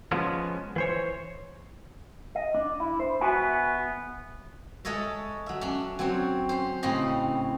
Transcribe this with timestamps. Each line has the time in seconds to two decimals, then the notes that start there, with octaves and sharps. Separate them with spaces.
0.12 F3 G#3 B3 C#4
0.76 E3 C5 C#5
2.35 D#5
2.54 D4
2.80 E4
3.00 C5
3.21 B3 F#4 E5 G#5
4.85 G#3 A4 C#5 D#5 E5
5.46 F#3 E5
5.61 C#4 D4
5.99 F#3 C4 C#5 G5
6.49 C#4 C5
6.83 A2 C#3 C4 C#4 D#5